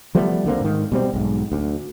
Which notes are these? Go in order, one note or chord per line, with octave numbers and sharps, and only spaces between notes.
F3 G3 A3 B3
C2 D3 A#3 C4
G#2 D#3
B2 G3 C4
B1 G#2
D2